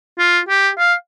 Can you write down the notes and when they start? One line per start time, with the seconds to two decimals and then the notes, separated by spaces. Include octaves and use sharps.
0.19 F4
0.49 G4
0.78 F5